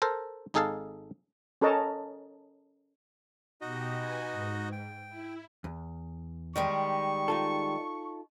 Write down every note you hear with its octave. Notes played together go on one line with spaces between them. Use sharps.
A4 A#4 C5 A5
G#1 D#4 G#4 A4 F5 A5
C#4 A4 A#4 C#5 D#5 A5
B2 D#4 F#4 G4 D#5
B4 G#5
G#2
G5
E4
E2
D#3 G3 G#3 C#6
D#4 F4 A4